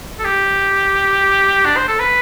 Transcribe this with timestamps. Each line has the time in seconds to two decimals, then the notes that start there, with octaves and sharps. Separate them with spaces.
0.19 A4
0.25 G4
1.65 D4
1.77 C5
1.88 A4
2.00 B4